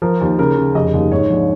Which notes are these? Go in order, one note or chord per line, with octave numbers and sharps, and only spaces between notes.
F3 A#4
D#2
C#3 A#4
C#3
F1 D#5
D#2
G#2 C#5
A#1